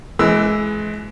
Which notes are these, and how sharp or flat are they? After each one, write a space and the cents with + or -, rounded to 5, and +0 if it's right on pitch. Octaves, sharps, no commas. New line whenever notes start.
E3 +20 G#3 +30 E6 +0